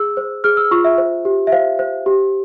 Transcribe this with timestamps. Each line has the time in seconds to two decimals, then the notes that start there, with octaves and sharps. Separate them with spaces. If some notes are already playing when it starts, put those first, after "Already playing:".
Already playing: G#4 E6
0.17 C5
0.44 G#4 F6
0.57 E6
0.71 F4 C#6
0.84 E5
0.98 C5
1.25 G4
1.47 E5
1.52 C5 F5
1.79 C5
2.06 G4